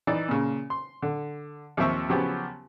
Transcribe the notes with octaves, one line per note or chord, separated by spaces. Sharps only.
E3 D#4 D5
A#2 C#3
C6
D3
D#2 F3 C4 E5 C#6
C#3 F3 F#3 B3 C#4 G4